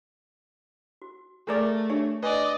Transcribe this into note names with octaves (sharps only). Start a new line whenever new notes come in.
F#4
A3 G#4 A#4 D5
D4 G4 C#5 E5
B4 D5 D#5 G#5